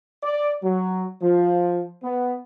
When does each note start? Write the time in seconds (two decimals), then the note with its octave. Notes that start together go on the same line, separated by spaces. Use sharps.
0.23 D5
0.63 F#3
1.22 F3
2.03 B3